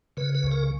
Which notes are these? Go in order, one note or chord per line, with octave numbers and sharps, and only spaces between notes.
C#3 B4
B4
C#2
A#4